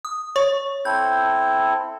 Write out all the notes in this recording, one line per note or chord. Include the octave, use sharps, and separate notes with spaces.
D#6
C#5 C#6
C4 E4 A4 G6